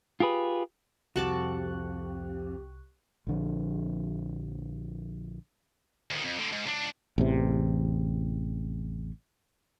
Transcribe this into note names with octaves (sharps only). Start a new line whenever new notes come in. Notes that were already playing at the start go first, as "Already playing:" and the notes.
F4 G4 G#4 B4
C2 F2 F#4 G4 A5 C#6 D6 F#6
A#1 D3 F3
D2 D#3
F2
A2 D3
G#2
C#2 D4
A1 E2 C3